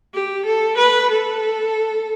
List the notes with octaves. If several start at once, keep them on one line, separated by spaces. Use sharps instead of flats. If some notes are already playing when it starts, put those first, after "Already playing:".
G4
A4
B4
A4